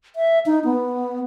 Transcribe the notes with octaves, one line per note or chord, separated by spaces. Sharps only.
E5
D#4
B3